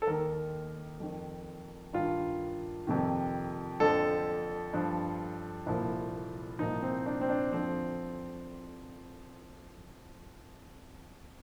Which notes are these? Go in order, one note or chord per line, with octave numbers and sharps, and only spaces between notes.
A4
D#2 D#3 A#4
F2 D#3
G2 D#3 F4
F2 C3 D#3
F2 D3 F3 A4
G2 F3
C2 A#2 F3
C2 A#2 F3 D#4
C4
D4
C4
D4
F2 D3 F3 C4